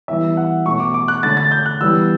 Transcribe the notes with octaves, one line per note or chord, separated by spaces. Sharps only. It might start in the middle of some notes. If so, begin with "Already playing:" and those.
E3 G3 B3 E5
F#5
B2 A3 C#4 C#6
D6
D6
F#6
D3 A3 C#4 A6
A6
G6
F#6
E3 G3 B3 E6